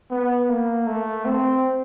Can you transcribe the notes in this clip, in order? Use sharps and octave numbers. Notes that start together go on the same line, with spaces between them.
B3
A#3
A3
C4